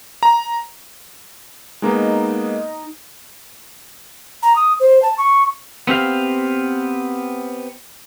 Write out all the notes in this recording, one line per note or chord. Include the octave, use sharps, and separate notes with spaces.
A#5
G#3 A#3 B3 D#4
A#5
D#6
C5
A5
C#6
B3 C4 G4 F5